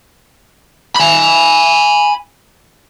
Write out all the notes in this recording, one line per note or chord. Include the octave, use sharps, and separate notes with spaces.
G#5 B5